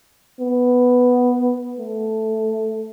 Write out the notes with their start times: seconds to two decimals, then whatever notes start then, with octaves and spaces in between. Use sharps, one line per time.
0.40 B3
1.79 A3